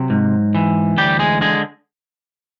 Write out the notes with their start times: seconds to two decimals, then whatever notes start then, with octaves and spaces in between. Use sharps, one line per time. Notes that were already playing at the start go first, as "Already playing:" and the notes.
Already playing: C3 F#3
0.10 G#2
0.55 E3
0.97 D2 G3 G4
1.19 G#3 G#4
1.41 D3 G#3 G#4